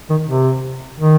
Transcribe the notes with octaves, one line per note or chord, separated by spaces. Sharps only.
D#3
C3
D#3